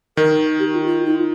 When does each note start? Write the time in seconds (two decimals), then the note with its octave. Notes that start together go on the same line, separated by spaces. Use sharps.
0.17 D#3 A#4
0.59 G4
0.73 F4
0.87 F4
1.06 D#4
1.15 F4